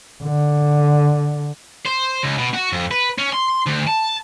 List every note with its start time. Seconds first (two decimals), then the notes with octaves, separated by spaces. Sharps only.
0.23 D3
1.86 C5
2.24 C#2
2.38 B2
2.54 F#4
2.73 F2
2.91 B4
3.18 C#4
3.33 C6
3.66 D2
3.87 A5